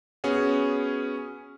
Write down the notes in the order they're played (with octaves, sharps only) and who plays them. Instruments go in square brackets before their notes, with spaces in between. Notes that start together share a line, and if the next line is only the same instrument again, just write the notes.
[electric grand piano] B3 C#4 F#4 G#4